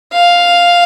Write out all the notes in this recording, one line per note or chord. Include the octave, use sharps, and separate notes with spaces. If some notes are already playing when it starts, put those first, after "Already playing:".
F5